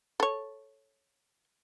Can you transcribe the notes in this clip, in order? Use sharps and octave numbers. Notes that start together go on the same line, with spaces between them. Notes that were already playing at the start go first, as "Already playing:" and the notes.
A4 C#5